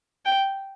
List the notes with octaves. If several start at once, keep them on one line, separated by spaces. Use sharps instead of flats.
G5